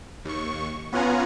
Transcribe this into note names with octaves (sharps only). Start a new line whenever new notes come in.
D#2 C#6
B3 C#4 F4 F#5 G#5 A#5